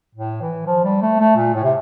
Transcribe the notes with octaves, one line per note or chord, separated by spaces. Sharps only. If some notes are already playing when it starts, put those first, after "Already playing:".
A2
E3
F3
G3
A3
A3
A#2
A2
C3